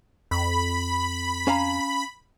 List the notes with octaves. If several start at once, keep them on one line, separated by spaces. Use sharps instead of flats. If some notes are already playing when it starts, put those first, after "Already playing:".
F2 B5
C#4 F5 A#5